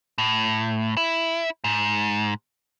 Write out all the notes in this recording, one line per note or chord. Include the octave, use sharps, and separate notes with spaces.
A2
E4
G#2